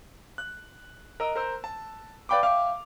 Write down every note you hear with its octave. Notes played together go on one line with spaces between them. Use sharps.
F#6
A#4 D#5 E6
A#4 C5 E6
A5
B4 D5 F5 G5 B5 D6
E5 F5 G5 D6 F6